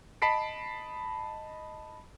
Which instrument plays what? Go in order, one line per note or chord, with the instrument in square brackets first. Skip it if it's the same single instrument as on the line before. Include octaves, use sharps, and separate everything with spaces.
[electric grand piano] D#5 A5 B5 B6 C7 D7